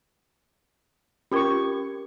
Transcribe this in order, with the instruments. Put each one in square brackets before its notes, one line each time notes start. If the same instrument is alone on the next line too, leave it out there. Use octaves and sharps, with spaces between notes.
[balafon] C#4 F4 A#4 [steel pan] G4 C#6